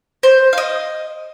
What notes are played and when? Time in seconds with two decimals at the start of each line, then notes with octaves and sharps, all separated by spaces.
0.23 C5
0.53 F5
0.58 D#5